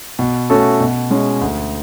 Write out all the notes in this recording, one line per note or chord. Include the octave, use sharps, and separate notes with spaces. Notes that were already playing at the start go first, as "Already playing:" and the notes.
B2
A3 C#4 F#4 A4
B2
G#3 C#4
D2